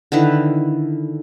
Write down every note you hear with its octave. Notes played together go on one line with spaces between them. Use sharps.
D3 D#3 E4 B4